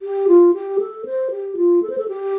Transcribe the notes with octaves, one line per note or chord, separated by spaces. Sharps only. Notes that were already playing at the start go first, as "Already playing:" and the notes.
G4
F4
G4
A4
C5
G4
F4
A4
C5
A4
G4